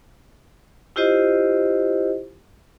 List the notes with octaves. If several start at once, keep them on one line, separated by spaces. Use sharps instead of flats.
E4 F4 G4 C5 D#5